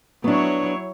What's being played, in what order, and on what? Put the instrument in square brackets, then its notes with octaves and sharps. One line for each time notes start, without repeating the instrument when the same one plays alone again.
[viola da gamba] F#3 E4 C#5 [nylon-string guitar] B3 D4